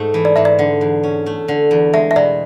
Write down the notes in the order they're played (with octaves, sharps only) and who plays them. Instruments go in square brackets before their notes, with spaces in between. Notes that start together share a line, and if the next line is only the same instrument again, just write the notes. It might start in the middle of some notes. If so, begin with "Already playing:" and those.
Already playing: [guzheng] G#2 A3
E3
[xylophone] D5
[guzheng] G#2 [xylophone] E5
[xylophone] D5
[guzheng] D3
E2
C#4
A3
D3
E2
[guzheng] G#3 [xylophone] E5
[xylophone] E5
[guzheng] B2 [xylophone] D5